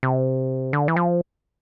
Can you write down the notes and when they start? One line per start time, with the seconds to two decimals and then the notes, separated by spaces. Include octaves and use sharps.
0.03 C3
0.73 D3
0.88 E3
0.96 F3